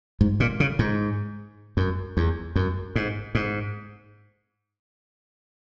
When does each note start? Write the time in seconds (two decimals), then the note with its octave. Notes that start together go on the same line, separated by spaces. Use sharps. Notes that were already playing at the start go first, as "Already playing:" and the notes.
0.21 G#2
0.40 A#2
0.60 C#3
0.79 G#2
1.77 F#2
2.17 E2
2.56 F#2
2.96 G#2
3.35 G#2